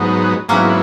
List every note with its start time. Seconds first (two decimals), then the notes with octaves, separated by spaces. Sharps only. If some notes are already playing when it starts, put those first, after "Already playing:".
Already playing: G#2 F#3 B3 D#4
0.49 G#2 F#3 A#3 B3 C#4 E4